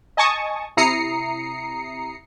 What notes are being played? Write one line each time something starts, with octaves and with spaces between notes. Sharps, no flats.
D#5 G#5 A5 C#6 D#6
C3 E4 A#5 D#6 C7 C#7